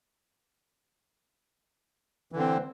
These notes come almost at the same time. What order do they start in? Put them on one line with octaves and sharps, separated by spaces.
E3 D3 C4